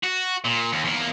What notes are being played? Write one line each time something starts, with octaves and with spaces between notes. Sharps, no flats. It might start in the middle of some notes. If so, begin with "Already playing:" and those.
F#4
A#2
D#2
E2 A#3